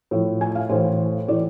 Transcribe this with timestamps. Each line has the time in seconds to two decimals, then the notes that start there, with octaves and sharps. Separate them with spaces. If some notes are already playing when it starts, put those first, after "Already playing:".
0.11 A2 F3
0.41 G#5
0.55 F5
0.69 A2 E3 C5
1.28 A2 E3 D5